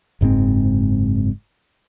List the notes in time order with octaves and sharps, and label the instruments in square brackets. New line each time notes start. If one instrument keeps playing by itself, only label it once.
[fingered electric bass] F#1 G#2 G#3 C4